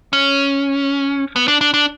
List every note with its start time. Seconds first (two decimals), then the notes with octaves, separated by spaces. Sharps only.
0.13 C#4
1.36 B3
1.48 D4
1.61 D4
1.74 D4